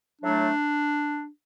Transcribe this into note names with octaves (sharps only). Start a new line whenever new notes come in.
A2 F#3 A3 D4